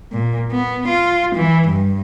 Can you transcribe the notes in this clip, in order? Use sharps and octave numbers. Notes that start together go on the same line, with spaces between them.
A#2
B3
F4
E3
G2